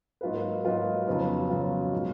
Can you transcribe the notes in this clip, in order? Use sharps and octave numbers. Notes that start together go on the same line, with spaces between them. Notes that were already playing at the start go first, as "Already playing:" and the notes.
G#2 F#3 A#3 F4 B4
G#2 F#3 A#3 F4 B4
F2 C#3 F#3 B3 F4
F2 C#3 F#3 B3 F4
B2 G#3 D#4